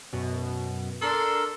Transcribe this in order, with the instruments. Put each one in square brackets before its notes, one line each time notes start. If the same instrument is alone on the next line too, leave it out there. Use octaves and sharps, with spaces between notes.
[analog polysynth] F#2 B2
[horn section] D4 A4 [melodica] A#4 [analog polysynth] C6